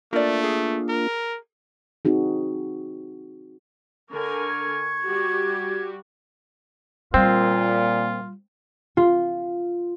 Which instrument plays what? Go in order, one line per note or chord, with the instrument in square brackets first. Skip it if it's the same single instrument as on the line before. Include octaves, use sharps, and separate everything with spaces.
[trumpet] A3 [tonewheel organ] A#3 D4 F4 [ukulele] A#4 D5
[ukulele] G#4
[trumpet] A#4
[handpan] C4 D#4 F#4 G#4
[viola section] D3 A#4 G#5 [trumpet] C#6
[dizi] G#6
[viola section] G3 F#4 G4
[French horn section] A#2 [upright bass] G3 [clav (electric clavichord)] C4 [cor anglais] F4
[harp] F4